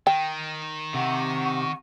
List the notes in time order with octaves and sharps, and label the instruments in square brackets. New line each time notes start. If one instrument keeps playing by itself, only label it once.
[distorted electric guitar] D#3 [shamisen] G5
[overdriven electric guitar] C3 [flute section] F#5 C#6